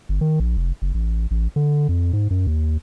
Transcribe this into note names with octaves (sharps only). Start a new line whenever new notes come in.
G1
D#3
A#1
F1
F#1
A1
A1
D3
F2
G#2
F#2
D#2